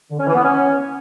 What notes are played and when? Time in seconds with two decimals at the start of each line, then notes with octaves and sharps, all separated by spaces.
0.11 D3
0.19 C#4
0.27 E3
0.35 B3
0.43 C#4